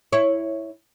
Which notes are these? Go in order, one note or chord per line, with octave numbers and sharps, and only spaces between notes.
E4 C#5